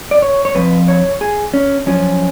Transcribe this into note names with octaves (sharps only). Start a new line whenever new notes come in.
D5
C#5
C#5
F2 F3 B4
C#5
G#4
C#4
F#2 F3 C#4